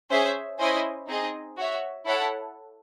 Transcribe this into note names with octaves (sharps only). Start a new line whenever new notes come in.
C#4 G#4 C5 E5
C#4 E4 C5 D#5 G#5
C4 D#4 G#4 D#5
F#4 C#5 E5
E4 A4 C#5 F#5 A5